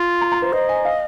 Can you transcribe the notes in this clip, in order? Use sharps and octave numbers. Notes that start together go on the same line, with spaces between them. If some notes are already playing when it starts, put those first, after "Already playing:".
Already playing: F4
A#5
A#5
C5
C5 D#5
G#5
F5